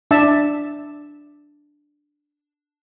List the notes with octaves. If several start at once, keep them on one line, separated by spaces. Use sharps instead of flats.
D4 E5 A5